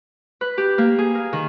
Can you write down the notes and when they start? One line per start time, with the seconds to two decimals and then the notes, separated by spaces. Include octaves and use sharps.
0.41 B4
0.58 G4
0.78 A#3
0.98 G#4
1.15 A#4
1.33 D#3